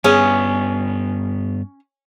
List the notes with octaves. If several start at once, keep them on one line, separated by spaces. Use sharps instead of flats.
G2 B3 C#4 G#4 G#5